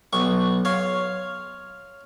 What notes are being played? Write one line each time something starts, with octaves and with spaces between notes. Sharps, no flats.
B1 C#6
C#5 F5 C6